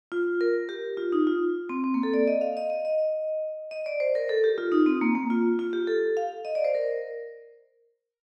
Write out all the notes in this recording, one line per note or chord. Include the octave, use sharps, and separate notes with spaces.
F4
A#4
G4
F4
D#4
F4
C4
C4
A#3
A4
D5
D#5
F5
D#5
D#5
D#5
D#5
D5
C5
A#4
A4
G4
F4
D#4
C4
A#3
A#3
F4
F4
G4
A4
F5
D#5
D5
C5
A#4